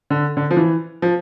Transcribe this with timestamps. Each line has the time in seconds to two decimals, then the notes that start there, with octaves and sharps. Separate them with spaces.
0.10 D3
0.37 D3
0.51 F3
0.57 E3
1.02 F3